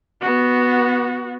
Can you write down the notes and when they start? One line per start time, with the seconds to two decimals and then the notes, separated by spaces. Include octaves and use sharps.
0.21 B3 F#4